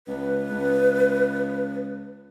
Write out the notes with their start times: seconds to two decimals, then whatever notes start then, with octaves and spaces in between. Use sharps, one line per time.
0.07 C#2 B4
0.51 C#2